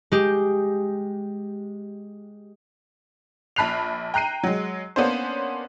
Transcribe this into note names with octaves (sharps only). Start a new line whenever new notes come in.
G#3 G4
A#1 A5 B5 F#6 C7 F7
G5 A#5 F#6 C7 D#7
F#3 G#3
A#3 B3 C#4 D4 C5